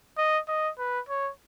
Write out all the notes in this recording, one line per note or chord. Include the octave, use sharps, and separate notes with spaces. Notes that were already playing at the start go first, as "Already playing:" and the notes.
D#5
D#5
B4
C#5